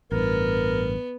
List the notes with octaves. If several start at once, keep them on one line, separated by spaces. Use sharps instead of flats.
A1 G2 B3 A#4